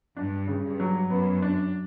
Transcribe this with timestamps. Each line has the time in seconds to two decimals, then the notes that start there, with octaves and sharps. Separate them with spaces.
0.16 G2 D4
0.48 C#3
0.63 G2
0.80 F#3
1.10 F#2 B3
1.42 D4